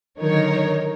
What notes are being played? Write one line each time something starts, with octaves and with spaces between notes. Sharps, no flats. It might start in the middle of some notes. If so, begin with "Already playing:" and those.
D3 D#3 F#3 D#4 A#4 C#5